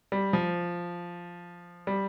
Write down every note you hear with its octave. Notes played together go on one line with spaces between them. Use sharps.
G3
F3
G3